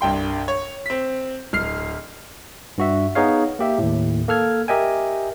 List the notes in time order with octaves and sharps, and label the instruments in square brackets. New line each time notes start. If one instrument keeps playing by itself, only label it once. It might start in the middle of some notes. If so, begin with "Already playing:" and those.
[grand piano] C2 G2 G5 C6
C#5
C4 B6
D1 F6 C7
[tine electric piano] G2 F#4 E5
B3 D#4 G#4 C#5 F5
A#3 G4 E5
D#2 A2
A#3 A4 F6 G#6
G4 A#4 D#5 E5 G5 G#5